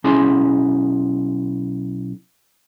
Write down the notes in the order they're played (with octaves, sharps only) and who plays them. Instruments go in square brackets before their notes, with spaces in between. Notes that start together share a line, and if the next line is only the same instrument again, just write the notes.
[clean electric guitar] B1 C#4 E4 G#4 C6